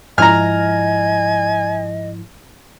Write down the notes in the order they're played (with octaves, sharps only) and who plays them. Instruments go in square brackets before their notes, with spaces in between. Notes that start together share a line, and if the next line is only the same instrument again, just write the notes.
[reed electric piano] G#2 F3 E4 [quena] D#5 [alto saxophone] G#5 [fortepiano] A#5 F6